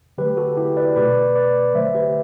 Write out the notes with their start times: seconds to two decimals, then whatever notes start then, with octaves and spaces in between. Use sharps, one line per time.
0.18 D3 F#3 A3 G4 B4
0.37 F#4 A4
0.57 E4 G4
0.77 B4 D5
0.96 B2 A3 B4 D5
1.35 B4 D5
1.75 D3 F#3 A3 C5 E5
1.95 G4 B4